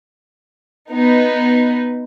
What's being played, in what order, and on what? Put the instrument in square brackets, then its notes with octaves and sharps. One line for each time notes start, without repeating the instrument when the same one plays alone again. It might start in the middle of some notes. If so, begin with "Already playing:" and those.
[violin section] B3 D#4